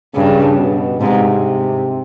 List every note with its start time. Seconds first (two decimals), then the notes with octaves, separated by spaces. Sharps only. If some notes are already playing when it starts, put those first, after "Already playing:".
0.15 G2 C#3
0.58 B2
1.01 G#2 C3